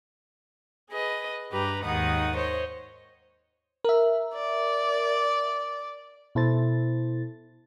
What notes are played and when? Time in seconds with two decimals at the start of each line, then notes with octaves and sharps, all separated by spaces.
0.91 G#4 B4 D#5
1.51 G2 G4 B4 A#5
1.84 D#2 G#2 D#3 D#4 F#5 D#6
2.36 C5 C#5 D#5
3.84 A#4 E5
4.34 D5
6.35 B2 E4 A4 C5 A6